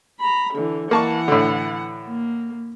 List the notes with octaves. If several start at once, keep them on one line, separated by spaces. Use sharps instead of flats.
A#5 B5
D3 E3
E3 A#3 F#5 A5 C#6
A2 D3
A#3